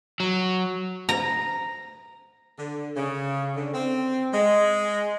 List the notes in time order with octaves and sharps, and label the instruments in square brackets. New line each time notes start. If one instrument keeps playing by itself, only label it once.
[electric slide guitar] F#3
[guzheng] A#5
[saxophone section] D3
C#3
D3
C4
G#3